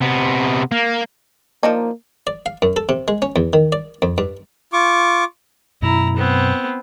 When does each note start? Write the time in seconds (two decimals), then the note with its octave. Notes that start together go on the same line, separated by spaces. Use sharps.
0.01 C3 B3
0.72 A#3
1.63 F3 A#3 D4 D#4
2.27 D5
2.46 F5
2.62 F#2
2.76 A4
2.89 C3
3.08 G#3
3.22 C#4
3.36 E2
3.53 D#3
3.72 D5
4.02 F2
4.18 G2
4.73 F4 C#6 D6
5.82 F#2 B2 E4 A#5
6.17 B3 C4